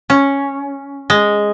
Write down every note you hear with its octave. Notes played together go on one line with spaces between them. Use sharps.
C#4
G#3